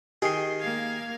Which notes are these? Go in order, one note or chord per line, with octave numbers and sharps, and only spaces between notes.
D#3 G4 G#4 C7
A#3 F5 G#6